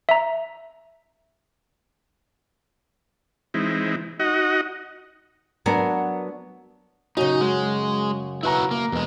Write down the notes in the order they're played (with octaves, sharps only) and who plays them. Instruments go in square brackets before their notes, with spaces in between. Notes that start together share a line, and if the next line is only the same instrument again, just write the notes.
[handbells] E5 A#5
[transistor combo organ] E3 G#3 C4 D#4 E4
D#4 F#4 D#5 F#5
[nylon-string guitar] F#3 B3 D4 A#4 F#5 G#5
[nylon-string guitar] F#2 C#3 [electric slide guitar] D#4 [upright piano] F#4
[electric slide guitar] G#3
[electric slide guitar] E4 F#4 [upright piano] B4 A#5
[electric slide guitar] A#3
E2 G#3